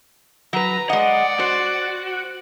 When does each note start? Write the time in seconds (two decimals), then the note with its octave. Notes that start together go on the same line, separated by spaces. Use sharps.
0.53 F#3 B4 A#5
0.89 G#3 D5 D#5 F#5
1.39 F#4 C5